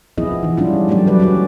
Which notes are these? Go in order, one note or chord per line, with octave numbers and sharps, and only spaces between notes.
F3 B3 C4 E4 G#4 D#5
E3 D#4
G3 C#4 D4 F4
F#3 G3 A3 G4 D5
F#3 G3 B4 D5
C#4 D4 F#4 B4